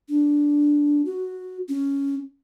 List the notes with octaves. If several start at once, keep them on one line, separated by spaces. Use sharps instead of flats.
D4
F#4
C#4